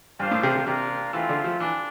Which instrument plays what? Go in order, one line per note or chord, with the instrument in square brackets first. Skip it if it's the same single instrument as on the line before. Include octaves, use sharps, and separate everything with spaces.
[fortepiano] G2 [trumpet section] A#3 D4 F4 C5 F5
[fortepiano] A2
C3
C3
[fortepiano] C3 [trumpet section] A#3 D4 F4 A#4
[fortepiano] E3 [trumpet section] A3 C4 F4
[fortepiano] D3
F3
[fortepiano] E3 [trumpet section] D4